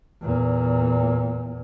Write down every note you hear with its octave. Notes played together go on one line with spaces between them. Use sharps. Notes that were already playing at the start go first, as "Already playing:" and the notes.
E2 A#2